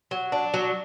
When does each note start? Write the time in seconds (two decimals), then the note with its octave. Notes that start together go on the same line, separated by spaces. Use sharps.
0.11 F#3
0.32 D4
0.54 F#3